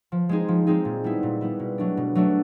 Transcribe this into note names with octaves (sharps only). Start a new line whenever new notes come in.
F3
G#3 C4 D#4 G#4
F3
G#3 C4 D#4 G#4
A#2
G3 B3 E4
A#2
G3 B3 E4
B2
F#3 A3 D4
B2
F#3 A3 D4